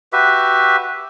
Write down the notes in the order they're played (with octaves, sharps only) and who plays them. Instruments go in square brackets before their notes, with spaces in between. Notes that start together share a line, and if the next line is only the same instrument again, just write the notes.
[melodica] F#4 G4 B4 E5